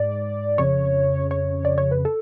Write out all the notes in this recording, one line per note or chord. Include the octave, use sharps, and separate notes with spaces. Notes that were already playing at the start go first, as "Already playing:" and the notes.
Already playing: G#2 D5
F2 C#3 C#5
C#5
D5
C#5
B4
A4